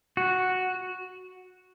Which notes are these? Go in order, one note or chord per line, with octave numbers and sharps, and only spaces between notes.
F#4